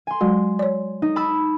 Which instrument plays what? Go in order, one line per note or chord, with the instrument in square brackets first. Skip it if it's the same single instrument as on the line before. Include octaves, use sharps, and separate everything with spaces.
[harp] G#5 C6
[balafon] F#3 G#3 F#4
C#5 D5
[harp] D#4
A5 B5 E6